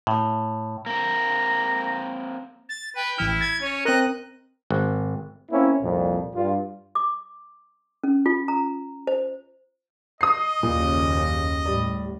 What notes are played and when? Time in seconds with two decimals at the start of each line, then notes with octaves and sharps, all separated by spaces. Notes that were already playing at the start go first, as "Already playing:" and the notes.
0.07 A2
0.86 A#3 C4 A#4 A#5
2.69 A6
2.96 B4 G5
3.18 A1 E3 E4 F6
3.41 G#6 A6
3.61 C#4 C#5
3.85 C4 A#4 D#5 F#6
4.70 G#1
5.52 A#3 C4 C#4 E4
5.82 C2 F2 A#2
6.35 G2 F4
6.95 D6
8.04 C#4
8.26 F4
8.48 A#5
9.07 C5
10.21 D#5 D#6 C7
10.63 F#1 D#2 A#2 C#3
11.65 A2 G3 D5